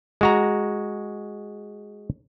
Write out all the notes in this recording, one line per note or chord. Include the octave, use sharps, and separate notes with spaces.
G#3 F#4 A#5